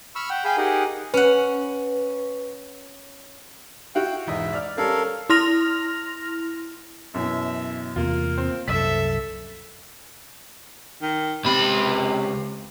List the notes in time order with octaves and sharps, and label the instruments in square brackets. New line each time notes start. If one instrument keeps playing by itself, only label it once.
[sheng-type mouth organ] B5 C#6 E6 F6
F#5 G5
G#4 F5 G5 G#5 B5
D#4 G4 G#4 A#4 F#5
[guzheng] C#4 F#5 [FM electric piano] B4
[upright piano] E4 F#4 F5 [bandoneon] G5
[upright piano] E1 E2 D#5 [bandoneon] G#2 E5
[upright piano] D5 F6
[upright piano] G3 C#4 [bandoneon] A4 A#4 F5
[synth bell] E4 C6 F6 A#6 F7
[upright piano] F#2 B2 E3 [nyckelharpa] E5
[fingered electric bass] E2 C3 [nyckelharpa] A#3 [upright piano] F4
[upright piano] C4
[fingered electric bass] C2 F#2 [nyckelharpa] A4 E5 [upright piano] B6
[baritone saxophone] D#3
[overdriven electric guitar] C#2 B5 [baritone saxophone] C3